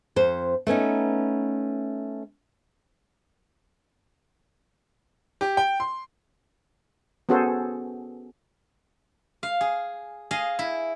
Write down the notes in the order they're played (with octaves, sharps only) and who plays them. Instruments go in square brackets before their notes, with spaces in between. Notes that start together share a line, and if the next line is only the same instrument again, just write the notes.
[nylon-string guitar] F2 C5
A3 B3 C#4 D#4
[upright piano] G4
G5
C6
[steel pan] B3 C#4 F#4 G#4 A4 C5
[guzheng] F5
G#4
G#4 D#5 F5
E4